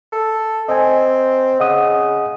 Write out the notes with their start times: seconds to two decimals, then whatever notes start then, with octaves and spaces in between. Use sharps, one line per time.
0.12 A4
0.69 C4 D#5 G#5
1.60 C#3 D#5 F#5 D#6